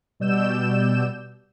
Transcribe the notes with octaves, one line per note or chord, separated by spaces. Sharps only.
B2 G3 D5 E6 G6 E7